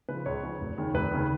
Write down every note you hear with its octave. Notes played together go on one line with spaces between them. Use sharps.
C#3 F3 B4
C#2 C#5
C#3 F3
F1
D#2 C#3
F1 B4
D#2 C#3